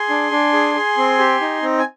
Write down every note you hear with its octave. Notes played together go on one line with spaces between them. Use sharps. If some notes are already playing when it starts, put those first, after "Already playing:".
Already playing: G#4 G#5 C6
D4
D4
G#4
G#4
C4
G4
D#4
C4
G#5